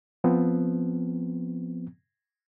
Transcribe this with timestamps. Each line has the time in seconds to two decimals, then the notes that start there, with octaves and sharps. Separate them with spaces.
0.24 F3 B3 C4